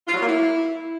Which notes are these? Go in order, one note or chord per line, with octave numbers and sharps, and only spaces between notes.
F4
F#3
A#3
E4